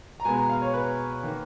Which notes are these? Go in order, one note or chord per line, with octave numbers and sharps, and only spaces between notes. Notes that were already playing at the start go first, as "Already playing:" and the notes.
A#5
B2 G#3 B3 G#5
A#5
F5
C#5
B4
D#3 A#3